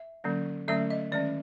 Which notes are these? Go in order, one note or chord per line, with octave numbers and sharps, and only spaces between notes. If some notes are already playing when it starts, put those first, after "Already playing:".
Already playing: E5
D3 F#3 A#3 C#4
D3 F#3 A3 C#4 E5
D#5
D#3 G#3 C#4 D5